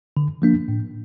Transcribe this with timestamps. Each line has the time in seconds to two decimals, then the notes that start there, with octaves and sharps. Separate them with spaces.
0.17 D3
0.42 F3 A#3 D4
0.68 A2